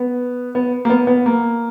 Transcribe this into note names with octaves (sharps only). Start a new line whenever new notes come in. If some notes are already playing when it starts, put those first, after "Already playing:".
Already playing: B3
B3
A#3
B3
B3
A#3